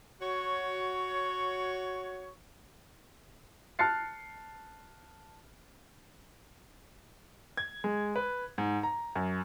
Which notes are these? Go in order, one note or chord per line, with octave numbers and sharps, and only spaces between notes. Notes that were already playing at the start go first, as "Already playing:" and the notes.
F#4 C#5
A5 F6 F#6 A6 C7 C#7
G#6
G#3
B4
G#2
A#5
F#2